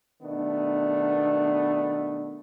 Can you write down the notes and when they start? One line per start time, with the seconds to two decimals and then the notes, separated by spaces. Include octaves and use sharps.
0.21 B2 D#3 A3 B3 D4